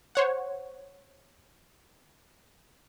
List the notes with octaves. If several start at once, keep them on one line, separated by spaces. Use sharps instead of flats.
C5 C#5 F#5